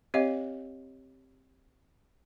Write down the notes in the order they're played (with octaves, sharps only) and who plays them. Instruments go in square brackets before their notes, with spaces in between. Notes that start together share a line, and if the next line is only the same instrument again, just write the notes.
[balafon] C4 G4 C#5 D#5 F5